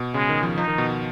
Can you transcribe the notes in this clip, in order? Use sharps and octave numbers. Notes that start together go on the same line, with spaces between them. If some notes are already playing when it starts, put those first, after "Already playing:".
Already playing: B2
C#3 G#3
D#3
F3
F3 D#4
D#3
B2